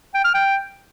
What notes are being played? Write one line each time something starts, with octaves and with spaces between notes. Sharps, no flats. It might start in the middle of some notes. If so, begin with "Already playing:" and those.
G5
F6
G5